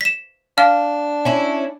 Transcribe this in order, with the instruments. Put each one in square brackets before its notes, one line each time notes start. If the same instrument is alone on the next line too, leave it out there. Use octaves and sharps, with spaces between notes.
[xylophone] B6 E7
[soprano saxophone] D4 [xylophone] F5 F6
[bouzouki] C#4 E4